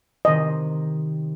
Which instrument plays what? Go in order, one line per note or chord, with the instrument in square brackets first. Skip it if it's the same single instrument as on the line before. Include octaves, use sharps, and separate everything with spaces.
[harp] C3 D#3 C4 [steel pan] D#5